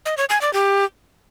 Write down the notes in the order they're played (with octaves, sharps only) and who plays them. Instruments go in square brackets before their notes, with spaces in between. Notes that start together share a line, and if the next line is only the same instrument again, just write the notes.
[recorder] D#5
C#5
G#5
D5
G4